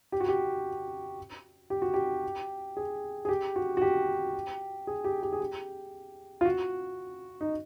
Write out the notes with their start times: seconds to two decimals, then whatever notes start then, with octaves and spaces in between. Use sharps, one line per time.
0.12 G4
0.20 F#4
0.28 G4
1.70 G4
1.82 F#4
1.94 G4
2.77 G#4
3.25 G#4
3.29 G4
3.56 F#4
3.77 F#4
3.82 G4
4.87 G#4
5.04 G4
5.23 G4
5.33 G#4
5.40 G4
6.41 F4
6.45 F#4
7.41 D#4